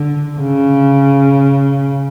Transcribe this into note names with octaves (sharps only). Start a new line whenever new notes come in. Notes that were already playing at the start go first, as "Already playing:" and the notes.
Already playing: D3
C#3